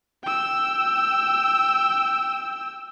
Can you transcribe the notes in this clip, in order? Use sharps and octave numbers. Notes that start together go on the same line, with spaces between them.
G5 E6